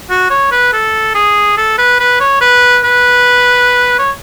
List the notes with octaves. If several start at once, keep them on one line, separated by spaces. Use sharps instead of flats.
F#4
C#5
B4
A4
G#4
A4
B4
B4
C#5
B4
B4
C#5